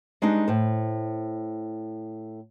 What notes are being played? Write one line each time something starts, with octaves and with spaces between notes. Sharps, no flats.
G3 G#3 B3 D4 D#4
A2 C5